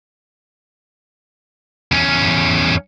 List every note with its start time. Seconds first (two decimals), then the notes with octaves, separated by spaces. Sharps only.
1.92 E2 C#4